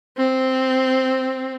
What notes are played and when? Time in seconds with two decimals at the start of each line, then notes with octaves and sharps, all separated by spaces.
0.17 C4